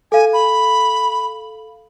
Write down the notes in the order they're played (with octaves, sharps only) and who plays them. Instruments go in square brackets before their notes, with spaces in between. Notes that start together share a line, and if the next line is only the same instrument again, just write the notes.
[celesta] A4 F5 [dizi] G#5
[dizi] B5